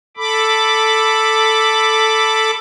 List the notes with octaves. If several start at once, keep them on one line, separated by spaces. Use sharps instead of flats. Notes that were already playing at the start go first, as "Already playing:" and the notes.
A4 B5 D6